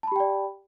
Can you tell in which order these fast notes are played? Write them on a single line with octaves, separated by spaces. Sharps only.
A5 B5 G4 G5 D5